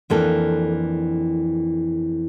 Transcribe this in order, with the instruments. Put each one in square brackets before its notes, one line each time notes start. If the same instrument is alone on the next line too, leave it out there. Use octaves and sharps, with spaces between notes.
[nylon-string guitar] F2 E3 A#3 D4 A4